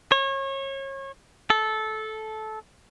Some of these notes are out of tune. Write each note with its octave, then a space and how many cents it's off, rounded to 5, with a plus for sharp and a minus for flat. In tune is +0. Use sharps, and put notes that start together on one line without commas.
C#5 -30
A4 -15